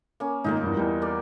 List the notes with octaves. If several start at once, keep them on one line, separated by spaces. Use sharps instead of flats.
A#3 C#4
G#2 D#3 A#3 D#4 F4 A#4
E2 G2
E2 G3
A#4 D5